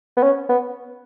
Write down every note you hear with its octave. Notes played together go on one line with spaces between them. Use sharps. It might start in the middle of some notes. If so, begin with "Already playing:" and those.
B3
C#4
B3